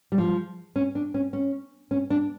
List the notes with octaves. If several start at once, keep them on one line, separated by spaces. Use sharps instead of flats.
G3
F3
C#4
D4
C#4
C#4
C#4
D4